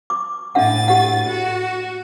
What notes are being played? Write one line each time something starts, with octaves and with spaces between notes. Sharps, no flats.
D6
A2 D4 E5 F#5 A6
G4 F#5
F#4